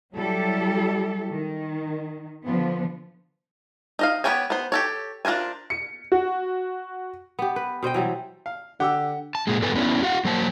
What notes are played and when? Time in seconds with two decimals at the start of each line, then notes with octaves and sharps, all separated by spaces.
0.14 F#3 G3 E4 G4 A4
1.33 D#3
2.45 D3 F3 B3
3.99 D#4 D#5 F5
4.24 B3 G4 C#5 G5 G#5
4.50 B3 C5
4.72 G4 A4 C#5
5.25 D4 F4 A#4 C5 G#5
5.70 C#7
6.12 F#4
7.39 B3 G4
7.56 B4
7.83 B2 C5 D#5 G5
7.94 E3 F#3 G3 C5
8.46 F5
8.80 D3 G4 F#5 D6 E6
9.35 A5
9.47 A#2 G#3
9.62 G2 B3 A4 B4 G#5
9.76 B3 C#4 D4 E4
10.03 F#4 F5 F#5
10.25 F#3 A#3 C5 D#5 A5